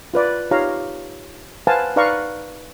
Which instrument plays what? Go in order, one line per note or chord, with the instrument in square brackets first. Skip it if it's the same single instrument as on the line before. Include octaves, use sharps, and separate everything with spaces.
[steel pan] F4 B4 D5
D#4 F4 G4 C#5 F5 A#5
B4 C5 F5 F#5 G#5 A5
D#4 B4 D5 F5 A#5 C#6